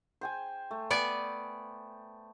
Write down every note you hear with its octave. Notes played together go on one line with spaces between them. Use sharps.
C5 G5 G#5
A3
B3 D5 G#5